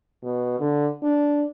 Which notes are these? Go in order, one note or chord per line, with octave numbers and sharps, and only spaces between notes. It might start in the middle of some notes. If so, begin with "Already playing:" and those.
B2
D3
D4